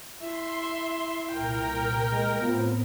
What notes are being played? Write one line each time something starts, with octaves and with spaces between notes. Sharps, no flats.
E4 E5 C6
C2 A#2 A#4 G5
G#3
A2 B3 C4 F4